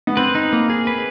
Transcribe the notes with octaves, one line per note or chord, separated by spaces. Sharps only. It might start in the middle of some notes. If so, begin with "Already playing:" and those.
B3
C4 B4
D#4
A#3
G#4
B4